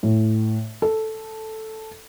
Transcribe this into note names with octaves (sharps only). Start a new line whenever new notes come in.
A2
A4